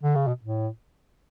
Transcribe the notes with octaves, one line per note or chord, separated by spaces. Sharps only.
D3
C#3
B2
A2